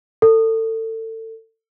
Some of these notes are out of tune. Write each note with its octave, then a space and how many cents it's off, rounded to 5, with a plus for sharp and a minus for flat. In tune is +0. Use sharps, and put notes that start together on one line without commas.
A4 +30